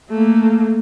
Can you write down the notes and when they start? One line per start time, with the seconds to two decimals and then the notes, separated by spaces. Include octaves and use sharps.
0.10 A3 A#3